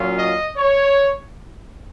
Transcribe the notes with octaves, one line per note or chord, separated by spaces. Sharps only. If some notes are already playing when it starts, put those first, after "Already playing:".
Already playing: A#2 F#3 C#4 F4
D#5
C#5